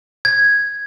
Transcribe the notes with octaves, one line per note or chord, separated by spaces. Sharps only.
G#6